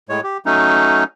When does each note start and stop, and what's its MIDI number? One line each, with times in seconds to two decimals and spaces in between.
0.09 0.21 45
0.09 0.21 56
0.09 0.21 73
0.24 0.38 67
0.46 1.04 54
0.46 1.04 57
0.46 1.04 61
0.46 1.04 63